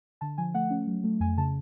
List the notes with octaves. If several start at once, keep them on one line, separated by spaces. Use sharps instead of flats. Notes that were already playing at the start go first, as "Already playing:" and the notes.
D3 A5
F3 G#5
A3 F#5
C#4
F#3
A3
F2 G#5
C#3 A5